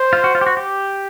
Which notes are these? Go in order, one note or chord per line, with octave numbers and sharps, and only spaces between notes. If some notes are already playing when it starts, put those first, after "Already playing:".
Already playing: C5
F4
F#4
F4
G4
F#4
G4